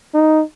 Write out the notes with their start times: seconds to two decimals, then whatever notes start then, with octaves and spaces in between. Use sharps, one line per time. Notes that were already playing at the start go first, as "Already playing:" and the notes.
0.14 D#4